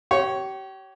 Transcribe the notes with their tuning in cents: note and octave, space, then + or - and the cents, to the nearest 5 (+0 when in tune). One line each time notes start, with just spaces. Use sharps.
G4 -35 C#5 +0